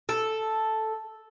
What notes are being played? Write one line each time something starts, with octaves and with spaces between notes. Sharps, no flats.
A4